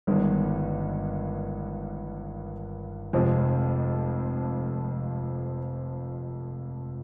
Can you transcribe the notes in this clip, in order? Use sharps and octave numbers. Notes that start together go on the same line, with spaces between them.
G1 G2 D#3 G#3
F1 F2 C3 F3 G#3